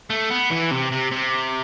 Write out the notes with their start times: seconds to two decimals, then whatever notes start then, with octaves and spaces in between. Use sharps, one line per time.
0.10 A3
0.30 B3
0.51 E3
0.71 C3
0.92 C3
1.11 C3